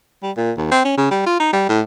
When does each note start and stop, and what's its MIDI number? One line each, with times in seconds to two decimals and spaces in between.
0.23 0.31 55
0.37 0.52 46
0.57 0.69 39
0.71 0.83 60
0.85 0.97 61
0.97 1.06 49
1.11 1.22 55
1.26 1.38 65
1.40 1.48 63
1.53 1.68 55
1.69 1.81 45